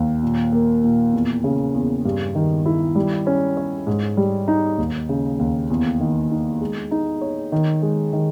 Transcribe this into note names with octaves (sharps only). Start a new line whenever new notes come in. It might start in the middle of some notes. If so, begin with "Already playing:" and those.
Already playing: D#2
A#2
A#3
A#2
E2
C#3
E2
G2
D#3
E4
G3
C#4
C#5
G#2
G3
D#4
D#2
C#3
D#2
E2
D#3
D#4
G#3
D#4
C#5
D#3
G#3
D#3